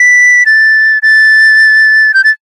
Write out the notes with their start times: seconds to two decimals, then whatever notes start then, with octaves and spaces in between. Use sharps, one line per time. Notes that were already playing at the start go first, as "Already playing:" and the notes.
Already playing: B6
0.46 A6
1.02 A6
2.14 G6
2.24 A6